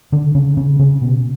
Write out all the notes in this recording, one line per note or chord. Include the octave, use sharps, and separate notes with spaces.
D3 D4
C#3 C#4
C#3 C#4
C#3 C#4
B2 B3